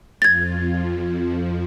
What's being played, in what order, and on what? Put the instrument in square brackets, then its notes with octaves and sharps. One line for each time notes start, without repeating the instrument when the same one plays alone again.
[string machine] F2 F3 [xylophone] G#6 A6